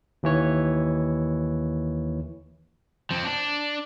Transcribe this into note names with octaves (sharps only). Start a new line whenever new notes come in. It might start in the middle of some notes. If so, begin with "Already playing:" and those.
D#2 E3 C#5
F3 C4
D4